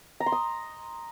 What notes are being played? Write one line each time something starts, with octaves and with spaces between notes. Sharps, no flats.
A#5
C6
D#6